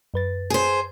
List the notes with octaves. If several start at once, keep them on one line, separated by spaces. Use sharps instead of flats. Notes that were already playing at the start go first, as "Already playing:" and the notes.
F#2 B4 A6
G#4 C5